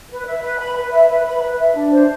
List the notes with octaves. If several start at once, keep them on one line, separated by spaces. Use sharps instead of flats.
B4
E5
B4
B5
B4
E5
B4
B5
B4
E5
D4
C5